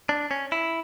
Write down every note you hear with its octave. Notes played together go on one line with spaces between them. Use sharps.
D4
C#4
E4